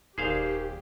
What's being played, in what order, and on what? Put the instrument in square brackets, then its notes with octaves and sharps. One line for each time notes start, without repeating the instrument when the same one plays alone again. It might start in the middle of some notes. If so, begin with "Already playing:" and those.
[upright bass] D#1 [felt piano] D#2 A#4 D5 [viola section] G4 [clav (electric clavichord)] G#4 C5 F5